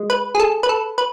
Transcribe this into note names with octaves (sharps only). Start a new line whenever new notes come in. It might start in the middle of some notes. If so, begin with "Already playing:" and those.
Already playing: G#3
B4
G#4
A4
B4
A4
B4